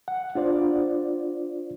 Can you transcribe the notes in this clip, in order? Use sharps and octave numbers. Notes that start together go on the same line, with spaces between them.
F#5
D4 F4 C5 D5